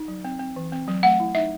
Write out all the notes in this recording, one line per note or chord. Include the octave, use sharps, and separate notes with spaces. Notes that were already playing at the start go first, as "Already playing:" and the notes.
Already playing: D#4
F#3
C4
C4
E3
C4
F#3
A3 F#5
E4
D#4 E5